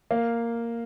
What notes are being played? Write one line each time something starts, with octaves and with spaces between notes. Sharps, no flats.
A#3 F5